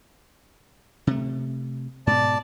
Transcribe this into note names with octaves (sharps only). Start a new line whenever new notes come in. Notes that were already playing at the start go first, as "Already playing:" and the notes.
C3 A3
G#2 B2 D5 A5